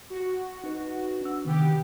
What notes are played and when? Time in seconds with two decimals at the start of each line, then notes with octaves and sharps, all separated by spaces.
0.10 F#4
0.64 D#4 B4
1.21 D4 E6
1.45 C3 D#3 B3 G4